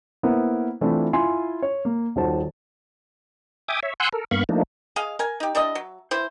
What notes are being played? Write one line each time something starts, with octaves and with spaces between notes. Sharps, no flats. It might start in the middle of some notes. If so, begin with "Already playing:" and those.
A#3 B3 E4 A#4 C5
E3 A3 C4 D4 E4 F4
E4 F4 G#5 C6
C#5
A#3
D#1 D#3 F#4 C5 A5
E5 G5 G#5 D6 D#6
C#5 E5
F#5 G#5 C6 E6 F#6 G6
A4 A#4
G2 A#3 B3 F5 B5 C#6
F3 A3 A#3 D4 D#4
G#4 D#5 F5
A#4 G#5
D#4 G4
G3 D4 E4 D#5
F#3
E3 E4 C5